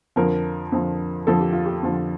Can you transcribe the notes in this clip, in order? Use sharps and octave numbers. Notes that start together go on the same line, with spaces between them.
F2 D3 F3 A#4
F2 D3 F3
F2 D3 F3 A4
G4
F4
G4
F2 D3 F3